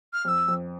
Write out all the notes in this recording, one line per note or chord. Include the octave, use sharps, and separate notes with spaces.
F6
F2 E6 F6
F2